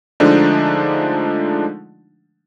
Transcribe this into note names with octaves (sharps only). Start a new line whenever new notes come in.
D3 F3 G#3 A3 D4 D#4